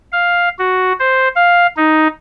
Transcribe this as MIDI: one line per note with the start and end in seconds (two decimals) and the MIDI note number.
0.12 0.49 77
0.59 0.93 66
0.99 1.28 72
1.35 1.67 77
1.76 2.07 63